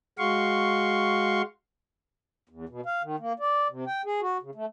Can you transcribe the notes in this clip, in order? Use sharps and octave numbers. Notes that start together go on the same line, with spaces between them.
G#3 F#4 F5 C6 C#6
E2
B2
F5
D#3
A#3
D5
C3
G5
G#4
F#4
C#3
A3